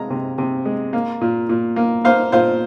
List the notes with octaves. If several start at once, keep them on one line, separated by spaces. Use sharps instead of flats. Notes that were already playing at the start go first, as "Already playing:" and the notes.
Already playing: C3 G#3 A#5
C3
C3
G#3
A#3
A#2
A#2
A#3
A#3 C5 F5
A#2 C5 F5